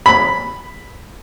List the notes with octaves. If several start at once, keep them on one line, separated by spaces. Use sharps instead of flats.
B5